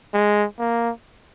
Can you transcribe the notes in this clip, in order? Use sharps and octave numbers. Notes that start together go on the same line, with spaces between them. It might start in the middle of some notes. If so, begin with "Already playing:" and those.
G#3
A#3